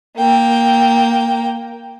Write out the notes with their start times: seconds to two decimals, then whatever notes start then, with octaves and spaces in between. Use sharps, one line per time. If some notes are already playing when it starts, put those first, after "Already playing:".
0.17 A#3 G5